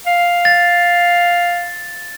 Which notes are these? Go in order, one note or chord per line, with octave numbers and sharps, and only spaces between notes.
F5
A6